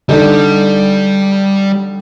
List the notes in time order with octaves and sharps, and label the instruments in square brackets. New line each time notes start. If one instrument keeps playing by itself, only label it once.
[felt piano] D3 D4 D#4 [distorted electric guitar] G3